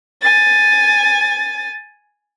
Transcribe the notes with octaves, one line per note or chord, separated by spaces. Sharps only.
G#5 A6